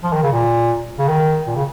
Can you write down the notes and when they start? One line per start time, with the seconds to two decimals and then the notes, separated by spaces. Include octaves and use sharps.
0.04 F3
0.13 D#3
0.23 C#3
0.32 A#2
0.99 C#3
1.08 D#3
1.47 A#2
1.56 C#3